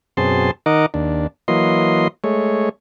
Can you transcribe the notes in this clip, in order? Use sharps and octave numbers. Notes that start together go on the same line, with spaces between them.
F#2 B2 C4 G#4 A5 C6
D#3 D#4 A#4 D#5 F#5 D6
D#2 D4
E3 F#3 A#3 D#5 C6
G#3 A3 C#5